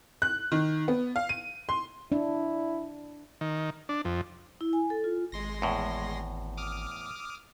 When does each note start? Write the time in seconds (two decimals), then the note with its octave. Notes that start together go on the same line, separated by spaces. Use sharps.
0.22 F#6
0.52 D#3
0.88 B3
1.16 F5
1.29 D#7
1.69 C6
2.12 D4 E4
3.41 D#3
3.89 D4
4.05 F2
4.61 E4
4.73 G#5
4.90 A4
5.04 F4
5.32 G#1 G#3 C6 A#6
5.62 E2 A2
6.57 D6 D#6 F6